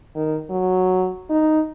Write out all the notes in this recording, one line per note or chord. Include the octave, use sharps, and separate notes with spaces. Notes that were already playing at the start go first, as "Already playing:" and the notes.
D#3
F#3
D#4